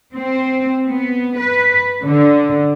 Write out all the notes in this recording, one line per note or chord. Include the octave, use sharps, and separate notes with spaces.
C4
B3
B4
D3